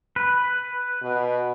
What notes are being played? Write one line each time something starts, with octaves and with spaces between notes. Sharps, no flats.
B4
B2